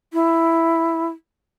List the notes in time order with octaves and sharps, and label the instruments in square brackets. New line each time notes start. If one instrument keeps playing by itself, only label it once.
[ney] E4